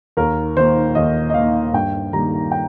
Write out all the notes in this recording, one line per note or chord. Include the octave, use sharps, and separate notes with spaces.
D#2 A#4
D#3 A#3 C5
D#2 D#5
D#5
D#3 A#3 F5
G2 G5
D#3 G3 A#3 A#5
G5